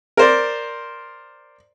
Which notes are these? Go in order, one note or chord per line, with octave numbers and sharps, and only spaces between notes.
A#4 C5 D5